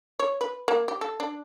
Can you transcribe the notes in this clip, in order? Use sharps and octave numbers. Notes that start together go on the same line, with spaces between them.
C#5
B4
A#3
G4
A4
D4